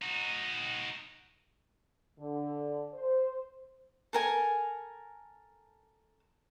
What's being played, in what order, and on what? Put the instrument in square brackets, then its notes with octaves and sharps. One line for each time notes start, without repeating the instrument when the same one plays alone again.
[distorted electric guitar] D#4 F#4
[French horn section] D3
C5
[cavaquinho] A4 A#4 G#5